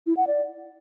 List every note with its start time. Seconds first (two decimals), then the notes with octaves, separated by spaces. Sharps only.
0.06 E4
0.17 F#5
0.27 D5